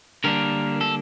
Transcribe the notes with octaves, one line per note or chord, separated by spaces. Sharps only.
D3 G3 A#3 D4 A#4
A4